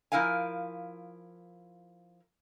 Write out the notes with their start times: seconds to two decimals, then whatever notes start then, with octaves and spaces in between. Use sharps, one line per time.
0.12 F3 D#4 E4 A#4 F5 G#5